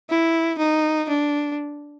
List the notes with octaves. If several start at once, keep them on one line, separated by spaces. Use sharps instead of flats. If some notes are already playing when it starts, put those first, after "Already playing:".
E4
D#4
D4